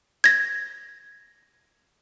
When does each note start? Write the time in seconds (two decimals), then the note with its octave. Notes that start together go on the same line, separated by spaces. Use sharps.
0.24 G#6 A#6